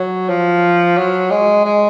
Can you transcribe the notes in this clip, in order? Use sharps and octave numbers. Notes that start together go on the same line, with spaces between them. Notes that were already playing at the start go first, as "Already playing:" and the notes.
Already playing: F#3
F3
F#3
G#3
G#3